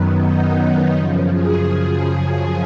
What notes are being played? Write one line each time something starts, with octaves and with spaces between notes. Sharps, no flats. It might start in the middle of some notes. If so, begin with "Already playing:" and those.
Already playing: F#2 D#3 F#3 B3
D#4
F#2 C#3 F3
G#4